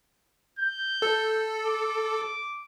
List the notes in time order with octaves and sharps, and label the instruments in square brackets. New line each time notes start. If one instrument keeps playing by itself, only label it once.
[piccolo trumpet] G6
[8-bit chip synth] A4
[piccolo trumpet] D6